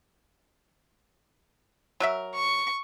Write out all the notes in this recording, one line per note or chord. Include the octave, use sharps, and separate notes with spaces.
F#3 A#4 E5
C#6